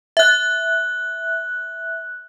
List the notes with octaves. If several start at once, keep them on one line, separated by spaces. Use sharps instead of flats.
E5 F#6